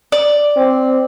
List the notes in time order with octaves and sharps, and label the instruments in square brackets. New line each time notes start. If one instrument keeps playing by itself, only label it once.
[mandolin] D5
[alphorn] C4